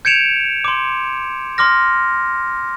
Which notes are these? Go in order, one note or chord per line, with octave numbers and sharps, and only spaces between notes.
G6 G#6 C#7 D7 E7 F7
C6 D6
C6 D6 F6 A#6